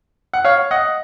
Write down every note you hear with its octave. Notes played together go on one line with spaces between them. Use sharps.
F#5
C#5 F5
D#5 F#5